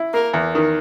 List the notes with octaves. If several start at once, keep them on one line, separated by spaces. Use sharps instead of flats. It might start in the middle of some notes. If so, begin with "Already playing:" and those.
Already playing: E4
A#3 A#4
E2
D#3